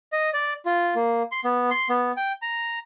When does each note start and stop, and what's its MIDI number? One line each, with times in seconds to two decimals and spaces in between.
0.12 0.30 75
0.33 0.53 74
0.66 0.94 65
0.95 1.23 58
1.32 1.40 84
1.44 1.70 59
1.71 1.88 84
1.89 2.12 59
2.17 2.32 79
2.42 2.79 82